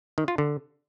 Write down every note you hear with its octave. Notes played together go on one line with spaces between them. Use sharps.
D#3
F4
D3